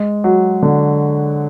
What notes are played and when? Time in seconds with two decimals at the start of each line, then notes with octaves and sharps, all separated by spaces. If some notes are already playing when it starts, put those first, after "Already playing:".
Already playing: G#3
0.24 F#3
0.62 D3